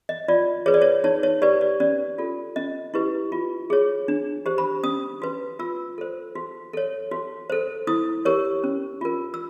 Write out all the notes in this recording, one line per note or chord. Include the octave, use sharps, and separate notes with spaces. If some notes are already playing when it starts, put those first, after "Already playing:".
D#5
F4 D5
G#4 B4 C#5
D5
C#5
D#4 C#5
C#5
G4 B4 D5
D5
C#4 D5
F4 A4
C#4 D#5
E4 G4 B4
F4
G#4 C#5
D4
G4 C5
B5
C#4 D#6
F#4 B4
F4 E6
A4 C5
F#4
A4 C#5
F#4
A4 C5
E4 D#6
G4 A#4 C#5
C#4
F4 A#4
E6